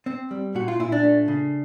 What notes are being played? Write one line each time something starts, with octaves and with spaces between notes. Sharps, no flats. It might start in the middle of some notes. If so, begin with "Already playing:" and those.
C4
G3
A#2 F#4
F4
A#2 E4
D4
A3
C#3